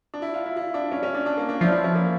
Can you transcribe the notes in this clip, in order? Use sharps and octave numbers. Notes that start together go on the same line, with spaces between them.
D4
E4
F4
E4
E4
D4
C#4
C#4
D4
D4
A#3
D4
F3 E4
E4
C#4
A#3